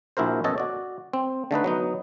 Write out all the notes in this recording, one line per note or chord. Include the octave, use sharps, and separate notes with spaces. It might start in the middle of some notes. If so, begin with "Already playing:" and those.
A#1 E4 F#4 A#4 C5
F#2 B2 A4 C#5 D#5 A5
F#4 D5
C4
D3 A3 D#4 B4
F#3 B3 D#4